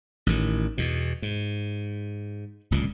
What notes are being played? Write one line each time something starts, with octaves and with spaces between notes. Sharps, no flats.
A1 A2 D#3
E2 B2
G#2
D1 C#2 A#2